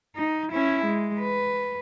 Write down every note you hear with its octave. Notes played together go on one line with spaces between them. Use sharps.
D#4
C#4 E4
G#3
B4